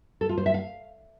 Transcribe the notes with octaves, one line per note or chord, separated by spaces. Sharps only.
A4
F4
C5
E5
F5